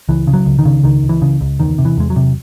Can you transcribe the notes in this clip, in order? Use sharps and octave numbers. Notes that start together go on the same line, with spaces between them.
C#2 E3
C#3
F#3
C#2
D#3
C#3
C#2 D#3
C#2
E3
C#3
C#2
E2 D#3
C3
E3
E2 G#3
F#3
C3